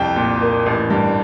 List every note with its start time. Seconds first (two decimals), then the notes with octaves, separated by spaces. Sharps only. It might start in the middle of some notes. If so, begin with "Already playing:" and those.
Already playing: C2 F2 G5
0.16 A#2
0.40 A#3
0.66 A1
0.90 G2